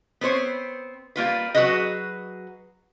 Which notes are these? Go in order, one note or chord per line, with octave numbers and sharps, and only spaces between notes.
B3 C4 C5 C#5
G3 A#3 F4 B4
F#3 B3 F#4 G#4 B4 D#5